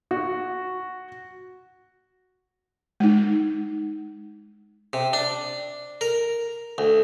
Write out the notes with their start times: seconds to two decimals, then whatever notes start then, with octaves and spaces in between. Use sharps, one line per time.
0.11 F#4
3.00 G#3 D#4
4.93 C3
5.13 D4
6.01 A#4
6.78 D2